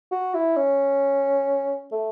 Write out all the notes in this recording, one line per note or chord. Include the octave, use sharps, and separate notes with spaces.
F#4
E4
C#4
A3